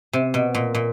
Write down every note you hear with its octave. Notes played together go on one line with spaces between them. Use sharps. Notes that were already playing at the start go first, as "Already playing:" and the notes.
C3
B2
A#2
A#2